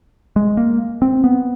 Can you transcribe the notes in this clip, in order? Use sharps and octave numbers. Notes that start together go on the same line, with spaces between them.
G#3
A#3
C4
B3